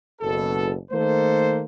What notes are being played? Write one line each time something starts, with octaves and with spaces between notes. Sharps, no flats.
F#1 B2 A4
D#3 A3 A#3 A4 C5